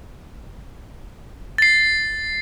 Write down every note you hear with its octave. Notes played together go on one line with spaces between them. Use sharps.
A6 C7